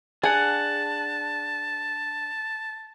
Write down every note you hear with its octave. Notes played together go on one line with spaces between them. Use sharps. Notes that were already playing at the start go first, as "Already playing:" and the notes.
D4 G#4 F#5 A5